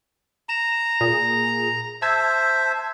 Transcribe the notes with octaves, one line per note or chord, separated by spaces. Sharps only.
A#5 E7
A#2 G#4
C5 E5 A5 E6 G#6